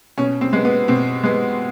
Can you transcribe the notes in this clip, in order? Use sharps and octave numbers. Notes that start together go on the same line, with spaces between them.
B2 C#4
C4
G#3 B3
B3
B2 C4
G#3 B3